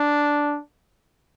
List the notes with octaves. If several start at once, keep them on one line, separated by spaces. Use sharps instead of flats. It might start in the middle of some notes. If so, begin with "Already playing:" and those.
Already playing: D4